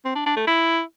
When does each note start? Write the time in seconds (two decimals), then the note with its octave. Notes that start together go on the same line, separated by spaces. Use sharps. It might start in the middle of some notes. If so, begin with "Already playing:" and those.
0.05 C4
0.15 D4
0.26 D4
0.36 A3
0.47 E4